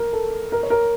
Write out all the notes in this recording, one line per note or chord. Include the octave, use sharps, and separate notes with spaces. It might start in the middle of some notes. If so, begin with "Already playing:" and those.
Already playing: A#4
A4
A#4
C#5
A#4